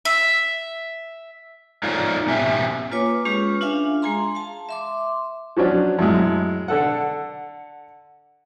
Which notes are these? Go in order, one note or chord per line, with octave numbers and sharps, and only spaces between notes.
E5
D#4 F4 G#4 C#5 D5 F5
B2 C#4 G4 E5
A#3 F4 B4 C#5 G#5 D6
G#3 C#4 F4 G4 G#4 B4
D4 F4 E5 F5 G#5
G#3 G#4 G#5 A#5 C6
F5 A5
E5 C6 D6
F3 F#3 C#4 D4
F#2 A2 G#3
D3 A4 F#5